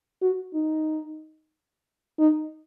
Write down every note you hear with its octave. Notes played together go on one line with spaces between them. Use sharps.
F#4
D#4
D#4